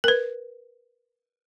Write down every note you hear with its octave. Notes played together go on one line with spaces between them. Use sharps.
A#4 B4